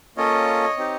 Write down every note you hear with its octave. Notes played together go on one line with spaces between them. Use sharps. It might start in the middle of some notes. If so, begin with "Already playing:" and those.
A#3 C#4 F4 A4 C#5 D#5
C4 D#4 G4